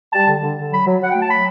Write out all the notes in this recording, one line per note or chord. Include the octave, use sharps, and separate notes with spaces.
G3 A5
D3
D3
D3
F#3 B5
F#3
F#3 F#5
A3 G5
A5
F#3 B5